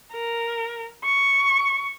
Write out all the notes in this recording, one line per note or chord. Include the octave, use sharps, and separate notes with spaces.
A#4
C#6